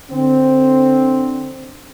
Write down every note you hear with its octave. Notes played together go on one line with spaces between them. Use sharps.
D3 C4